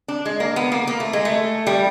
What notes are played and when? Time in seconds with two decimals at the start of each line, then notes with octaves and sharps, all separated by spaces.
0.08 D4
0.25 G#3
0.40 A#3
0.56 B3
0.72 A#3
0.88 A#3
1.00 A3
1.13 G#3
1.25 A3
1.67 G3